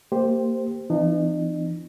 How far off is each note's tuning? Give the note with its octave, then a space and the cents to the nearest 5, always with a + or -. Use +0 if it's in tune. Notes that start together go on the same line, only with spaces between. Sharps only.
A#3 -25 G4 +0 C5 +0
E3 +30 C4 -45 D#4 -40